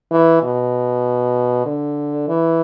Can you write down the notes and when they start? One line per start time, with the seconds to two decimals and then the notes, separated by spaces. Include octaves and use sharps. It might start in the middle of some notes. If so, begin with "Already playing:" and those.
0.11 E3
0.43 B2
1.66 D3
2.28 E3